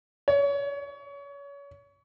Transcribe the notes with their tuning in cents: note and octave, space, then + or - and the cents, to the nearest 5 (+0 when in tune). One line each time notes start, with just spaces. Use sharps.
C#5 +30